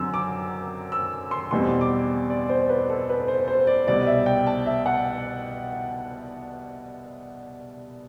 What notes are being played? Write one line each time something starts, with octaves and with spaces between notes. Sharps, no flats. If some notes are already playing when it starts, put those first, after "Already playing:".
Already playing: F#2 D3 F#3 C4 E6
D6
E6
C6
E2 B2 G3 C4 C6
D6
D5
C5
B4
A4
B4
C5
C5
D5
C2 B2 G3 D5
E5
G5
A5
E5
F#5